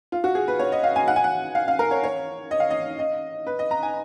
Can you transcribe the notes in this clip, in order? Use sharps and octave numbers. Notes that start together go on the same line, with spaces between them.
F4
F#4
G#4
B4
C#5
D#5
F5
G#5
F#5
G#5
F#5
F5
F5
A#4
C#5
C#5
D#5
F5
D#5
D#5
B4
D#5
A#5
G#5